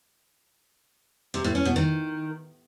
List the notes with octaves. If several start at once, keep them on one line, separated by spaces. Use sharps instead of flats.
C3
A2
C#4
B2
D#3